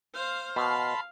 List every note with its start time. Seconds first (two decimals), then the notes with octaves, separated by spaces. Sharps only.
0.14 C5 F5
0.56 B2 F5 A5 B5 C6